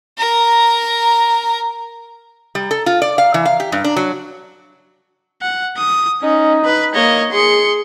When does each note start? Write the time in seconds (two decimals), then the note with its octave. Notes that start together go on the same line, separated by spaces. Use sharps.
0.18 A#4 A#5
2.55 G3
2.71 A4
2.86 F4
3.02 D5
3.18 F5
3.34 E3
3.45 F5
3.60 G4
3.72 G2
3.84 D4
3.96 F#3
5.42 F#5
5.78 D#6
6.22 C#4 D#4
6.65 B4 B5
6.94 A#3 C#5 D#5
7.33 G#4 C6 C#7